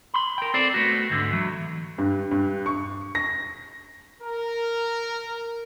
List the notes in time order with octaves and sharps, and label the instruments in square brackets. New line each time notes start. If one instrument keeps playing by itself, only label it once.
[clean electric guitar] B5 C6
A#4 G5
C4 A4 C5 D5
A3 B3 F#4
D2 G#2 D3
E3 F#3
[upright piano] G2
G2
C#6
A#6
[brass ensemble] A#4